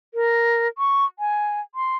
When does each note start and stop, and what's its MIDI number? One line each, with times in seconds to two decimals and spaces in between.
0.14 0.68 70
0.78 1.05 85
1.19 1.61 80
1.75 1.97 84